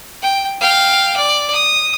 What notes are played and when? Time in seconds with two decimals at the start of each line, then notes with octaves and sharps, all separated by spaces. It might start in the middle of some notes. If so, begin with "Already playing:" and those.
0.22 G5
0.61 F5 G5
1.16 D5
1.53 D#6